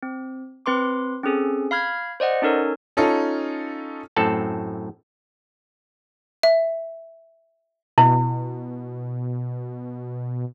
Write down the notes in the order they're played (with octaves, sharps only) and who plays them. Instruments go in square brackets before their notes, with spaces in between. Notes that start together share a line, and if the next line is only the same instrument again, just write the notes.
[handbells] C4
C4 B4 C6 D6
C4 C#4 G#4 A4
F5 B5 F6 G#6
C5 D5 D#5 F#5
C#4 D#4 A4 A#4 C#5
[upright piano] C#4 D#4 F4 A4
[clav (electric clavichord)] F#2 A2 C4 A4 A5
[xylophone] E5
[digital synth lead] B2 [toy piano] E4